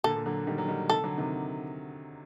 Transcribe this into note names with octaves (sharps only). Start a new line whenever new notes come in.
A#2 D3 A4
A#2 D3
D3 F#3
D#3 G3
F#3
D#3 G3
C3 D#3 A4
D3 F#3
C3 D#3